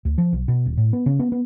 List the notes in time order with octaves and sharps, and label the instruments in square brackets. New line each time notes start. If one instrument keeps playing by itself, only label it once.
[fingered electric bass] D2
F3
B1
B2
D#1
A2
B3
C#3
B3
B3